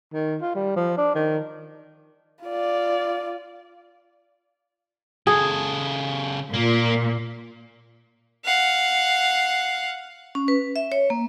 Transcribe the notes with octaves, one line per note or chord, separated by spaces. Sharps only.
D#3
F4
G3
F3
D4
D#3
F4 D5
C#3 G#4 A4
A#2 A#3
F5 F#5
C#4
B4
E5
C#5
A#3